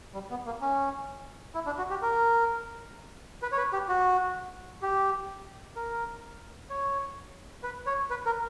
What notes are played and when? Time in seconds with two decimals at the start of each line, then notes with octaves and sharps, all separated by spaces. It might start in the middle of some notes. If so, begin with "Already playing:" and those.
0.14 G3
0.30 B3
0.46 A#3
0.61 C#4
1.55 E4
1.66 D4
1.78 F#4
1.90 G4
2.02 A#4
3.42 B4
3.52 C#5
3.58 B4
3.73 G4
3.89 F#4
4.82 G4
5.76 A#4
6.70 C#5
7.63 B4
7.86 C#5
8.10 B4
8.26 A#4